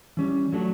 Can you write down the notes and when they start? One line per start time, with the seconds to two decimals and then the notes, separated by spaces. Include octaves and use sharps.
0.17 E3 G3 C#4
0.52 F#3 A3 D4 F#4